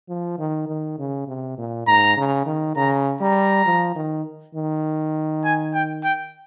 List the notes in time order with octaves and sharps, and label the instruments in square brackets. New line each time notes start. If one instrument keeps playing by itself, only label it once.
[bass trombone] F3
D#3
D#3
C#3
C3
A#2
[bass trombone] G#2 [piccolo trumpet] A#5
[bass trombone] C#3
D#3
[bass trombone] C#3 [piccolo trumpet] A#5
[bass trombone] G3 [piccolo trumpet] A#5
[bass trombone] F3
D#3
D#3
[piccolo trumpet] G#5
G5
G5